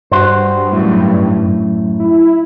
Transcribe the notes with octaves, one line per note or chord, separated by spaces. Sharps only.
G2 F#4 C5
F#2 A2
E4